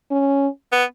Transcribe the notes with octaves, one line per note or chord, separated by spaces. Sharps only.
C#4
B3